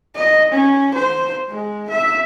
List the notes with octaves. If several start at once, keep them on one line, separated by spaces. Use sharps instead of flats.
D#5
C#4
C5
G#3
E5